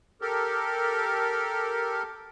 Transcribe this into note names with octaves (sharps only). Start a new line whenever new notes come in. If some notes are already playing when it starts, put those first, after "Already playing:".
G4 A4 A#4